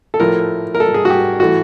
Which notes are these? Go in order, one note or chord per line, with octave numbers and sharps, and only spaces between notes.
A4
A2 F3 A3 A#4
A#4
A4
G#4
F#4
G4
E3 A3 F#4